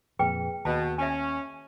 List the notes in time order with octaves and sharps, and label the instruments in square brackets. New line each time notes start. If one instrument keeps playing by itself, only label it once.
[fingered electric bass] F2 A#2 [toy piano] G#4 B4 G5
[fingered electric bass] D#2 [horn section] B2 [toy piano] A5
[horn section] C#4 [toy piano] E5 G#5